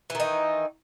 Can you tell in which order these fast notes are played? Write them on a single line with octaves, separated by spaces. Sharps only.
E3 D#3 D#4